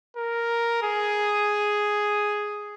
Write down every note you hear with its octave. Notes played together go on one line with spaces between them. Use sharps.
A#4
G#4